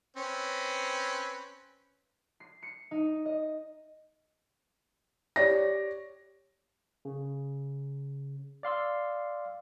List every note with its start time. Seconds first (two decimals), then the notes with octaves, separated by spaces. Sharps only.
0.16 C4 C#4 B4
2.40 C7
2.63 C#7
2.91 D#4
3.25 D#5
5.36 G4 C#5 D5 A#6
7.05 C#3
8.63 D5 F5 C6 E6